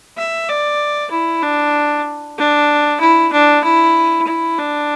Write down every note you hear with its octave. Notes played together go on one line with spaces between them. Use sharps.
E5
D5
E4
D4
D4
E4
D4
E4
E4
D4